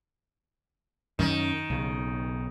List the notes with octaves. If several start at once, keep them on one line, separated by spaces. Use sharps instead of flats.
F#2 D#3 C#4
B1 C#3